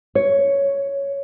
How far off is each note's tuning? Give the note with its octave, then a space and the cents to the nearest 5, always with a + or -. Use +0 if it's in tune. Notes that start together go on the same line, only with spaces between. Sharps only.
C#5 +5